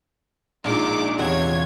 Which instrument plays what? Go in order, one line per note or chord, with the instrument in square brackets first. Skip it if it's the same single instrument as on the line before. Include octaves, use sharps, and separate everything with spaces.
[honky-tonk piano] A#1 A#2 G#3 [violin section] D#4 D5 D6
[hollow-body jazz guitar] E2 C3 F#5 [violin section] F4 C#5 G#6